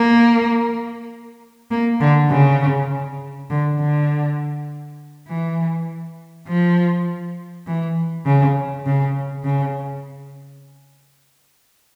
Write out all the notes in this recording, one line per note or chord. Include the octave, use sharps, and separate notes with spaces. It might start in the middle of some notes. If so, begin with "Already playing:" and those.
Already playing: A#3
A#3
D3
C#3
D3
D3
E3
F3
E3
C#3
C#3
C#3